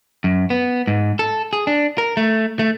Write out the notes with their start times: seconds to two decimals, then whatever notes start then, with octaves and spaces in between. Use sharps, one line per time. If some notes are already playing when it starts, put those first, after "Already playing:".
0.24 F#2
0.50 B3
0.87 G#2
1.19 A4
1.53 G#4
1.67 D4
1.98 A#4
2.17 A3
2.59 A3